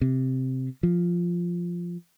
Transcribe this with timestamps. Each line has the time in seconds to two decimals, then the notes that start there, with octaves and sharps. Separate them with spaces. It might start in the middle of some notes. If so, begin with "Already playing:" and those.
0.01 C3
0.83 F3